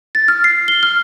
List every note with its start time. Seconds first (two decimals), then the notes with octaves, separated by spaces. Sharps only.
0.15 A6
0.28 F6
0.44 C7
0.68 G7
0.83 F6